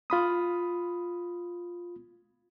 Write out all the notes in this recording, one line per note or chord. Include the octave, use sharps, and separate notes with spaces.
F4 B5 D#6